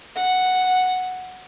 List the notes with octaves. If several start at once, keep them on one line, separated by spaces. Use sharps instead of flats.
F#5